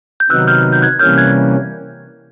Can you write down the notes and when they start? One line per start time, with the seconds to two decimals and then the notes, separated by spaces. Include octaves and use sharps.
0.20 G6
0.30 C3 D#3 F#3 B3 D#4 E6 F#6
0.47 F6 G6
0.72 G6
0.82 F#6 G#6
0.99 C3 E3 G3 A#3 C#4 F6 G6
1.18 F#6 G#6